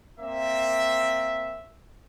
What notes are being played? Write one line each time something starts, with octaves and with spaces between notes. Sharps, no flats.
A#3 C4 E5